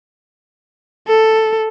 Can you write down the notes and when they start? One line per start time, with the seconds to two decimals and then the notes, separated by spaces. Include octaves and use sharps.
1.07 A4